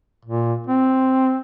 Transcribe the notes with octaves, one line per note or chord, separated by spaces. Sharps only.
A#2
C4